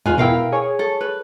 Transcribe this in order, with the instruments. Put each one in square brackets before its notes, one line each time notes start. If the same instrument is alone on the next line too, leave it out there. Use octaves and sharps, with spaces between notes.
[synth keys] E2 G#2 [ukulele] F4 B4 G#5
[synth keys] B2 E4 [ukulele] A#4 F5 G5
[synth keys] G#4 C#5
[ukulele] A4
B4